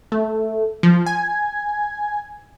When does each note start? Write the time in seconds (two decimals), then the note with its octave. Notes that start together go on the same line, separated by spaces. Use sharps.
0.12 A3
0.83 F3
1.06 G#5